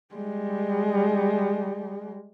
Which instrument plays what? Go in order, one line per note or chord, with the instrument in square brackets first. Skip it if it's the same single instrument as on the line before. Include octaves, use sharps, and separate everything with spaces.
[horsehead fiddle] G3 G#3